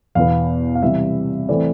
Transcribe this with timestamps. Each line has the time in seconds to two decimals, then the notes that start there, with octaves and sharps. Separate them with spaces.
0.15 E2 B2 B3 F5
0.75 F5
0.83 C3 E3 G3 E5
1.49 E3 A3 C4 D5